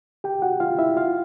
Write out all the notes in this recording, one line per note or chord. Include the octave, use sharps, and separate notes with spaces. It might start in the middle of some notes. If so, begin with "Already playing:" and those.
G4 G5
F#4 F#5
F4 F5
E4 E5
F4 F5